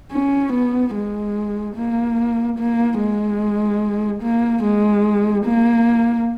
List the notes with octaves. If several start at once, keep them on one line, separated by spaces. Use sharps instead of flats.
C#4
B3
G#3
A#3
A#3
G#3
A#3
G#3
A#3